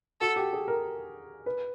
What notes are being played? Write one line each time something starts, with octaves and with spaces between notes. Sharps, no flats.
F#4 A4
G4
G#4
A#4
B4